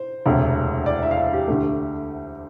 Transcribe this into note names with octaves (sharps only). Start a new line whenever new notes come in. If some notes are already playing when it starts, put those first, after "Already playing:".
Already playing: C5
E1 D2 C3
D5
E5
F5
E5
G4
D2 D3 A3